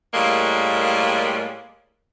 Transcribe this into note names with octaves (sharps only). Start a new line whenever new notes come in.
A2 G3 G#3 A#3